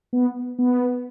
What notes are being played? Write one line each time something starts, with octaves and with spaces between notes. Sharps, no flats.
B3
B3